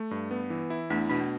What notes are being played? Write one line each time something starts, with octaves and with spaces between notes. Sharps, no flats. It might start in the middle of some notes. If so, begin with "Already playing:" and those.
Already playing: A3
G2
B3
E3
E4
E2 A3 D4
B2 D4
B3